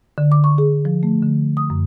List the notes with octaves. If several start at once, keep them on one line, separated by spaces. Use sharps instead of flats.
D3
D6
C#6
G#4
F3
A3
D3
D#6
F#2